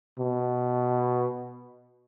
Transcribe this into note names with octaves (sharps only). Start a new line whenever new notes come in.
B2